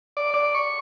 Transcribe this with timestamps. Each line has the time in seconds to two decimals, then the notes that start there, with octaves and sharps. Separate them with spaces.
0.17 D5
0.34 D5
0.55 C#6